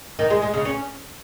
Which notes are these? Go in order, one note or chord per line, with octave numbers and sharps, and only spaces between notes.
D#3
G#3
G#3
C#3
C#4